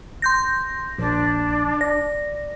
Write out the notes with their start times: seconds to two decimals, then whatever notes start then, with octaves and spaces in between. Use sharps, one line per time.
0.22 C6 G6 A#6
0.98 A#1 D4
1.81 D5 A#6